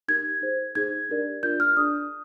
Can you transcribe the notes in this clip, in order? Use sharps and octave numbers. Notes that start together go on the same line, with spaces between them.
D#4 G4 A#4 G#6
D#4 G#4 C5
D#4 G#4 C5 G#6
D4 G4 A#4 D5
D4 F4 A#4 D5 G6
F6
D4 G#4 D5 D#6